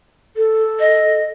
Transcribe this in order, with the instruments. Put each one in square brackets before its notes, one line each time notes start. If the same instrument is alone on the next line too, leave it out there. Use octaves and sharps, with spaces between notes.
[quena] A4
[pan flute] D#5